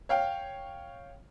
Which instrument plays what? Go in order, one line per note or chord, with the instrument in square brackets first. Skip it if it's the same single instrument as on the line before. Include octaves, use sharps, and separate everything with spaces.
[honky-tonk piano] C#5 F5 G5